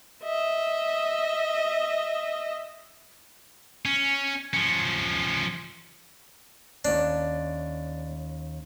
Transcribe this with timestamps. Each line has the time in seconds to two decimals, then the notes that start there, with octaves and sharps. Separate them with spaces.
0.24 D#5 E5
3.85 C#4
4.54 F3 C#4
6.85 D#2 C#4 D4